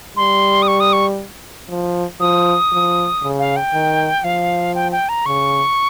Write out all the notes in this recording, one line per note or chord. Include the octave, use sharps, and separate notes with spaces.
G3 C6
D#6
C#6
D#6
C#6
F3
F3 D#6
F3
C#3
F5
G5
D#3
F3 F5
G5
G5
A#5
C#3 C#6